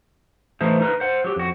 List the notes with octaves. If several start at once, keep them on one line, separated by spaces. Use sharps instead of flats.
E3 A3 D#4 C5
D#4 A#4 B4
C5 F#5
F#3 G4
F2 F#4